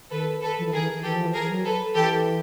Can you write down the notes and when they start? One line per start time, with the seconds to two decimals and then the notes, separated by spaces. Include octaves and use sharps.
0.11 D#3 A4 B4
0.42 A4 B4
0.58 F3
0.65 E3
0.73 D#3 G#4 A#4
0.82 E3
1.03 E3 G4 A4
1.15 F3
1.26 E3
1.34 G#4 A#4
1.49 F#3
1.65 A4 B4
1.95 E3 G4 A4